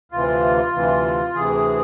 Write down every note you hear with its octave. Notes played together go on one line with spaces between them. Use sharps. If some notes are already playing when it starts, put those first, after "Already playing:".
D2 C3 E3 F4
D2 C3 E3
D2 C3 E3 G#4